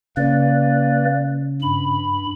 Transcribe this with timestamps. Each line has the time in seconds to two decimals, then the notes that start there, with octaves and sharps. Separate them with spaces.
0.17 C#3 A#3 B4 D5
1.62 G2 B5